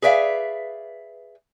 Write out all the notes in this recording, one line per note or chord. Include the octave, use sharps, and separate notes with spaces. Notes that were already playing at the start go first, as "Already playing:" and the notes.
G#4 B4 D5 E5 F5